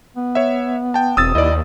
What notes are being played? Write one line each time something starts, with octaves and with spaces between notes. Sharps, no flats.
B3
C#5 E5
G5 A5
E1 C4 D#6 E6 A6
D#2 E4 D5 D#5